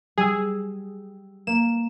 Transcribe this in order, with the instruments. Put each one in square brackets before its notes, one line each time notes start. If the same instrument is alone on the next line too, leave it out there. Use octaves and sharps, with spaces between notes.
[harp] G3 E6 [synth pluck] G#4
[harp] A#3 [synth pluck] E7